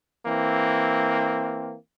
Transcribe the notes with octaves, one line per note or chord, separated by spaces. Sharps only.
E3 A#3 C4